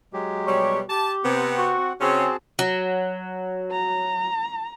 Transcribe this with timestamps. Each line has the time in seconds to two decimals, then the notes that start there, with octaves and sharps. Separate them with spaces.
0.13 F#3 G#3 G4
0.46 B2 G3 C#5
0.89 G4 A5
1.24 C3 B3 C4 F#5
1.58 F#4
2.01 C#3 C4 C#4 F#4 G#4 A5
2.59 F#3
3.71 A#5